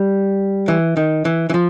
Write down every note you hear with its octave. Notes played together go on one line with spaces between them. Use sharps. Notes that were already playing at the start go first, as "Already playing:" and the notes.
Already playing: G3
E3
D#3
E3
E3
F3